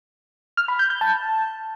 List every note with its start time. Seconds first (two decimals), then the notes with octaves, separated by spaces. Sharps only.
0.57 F6
0.68 B5
0.79 G6
0.90 G6
1.01 A5